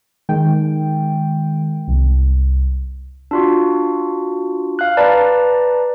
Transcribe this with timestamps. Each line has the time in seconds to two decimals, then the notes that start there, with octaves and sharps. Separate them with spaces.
0.29 D#3 G#3 G5
1.88 C2
3.31 D4 F4 F#4
4.79 F5 F#6
4.97 B4 D5 A5 A#5